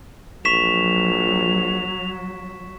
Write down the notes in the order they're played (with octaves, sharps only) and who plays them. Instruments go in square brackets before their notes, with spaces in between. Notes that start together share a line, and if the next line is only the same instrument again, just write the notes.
[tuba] A#1 [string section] F#3 [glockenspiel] C#6 B6 E7 [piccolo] F7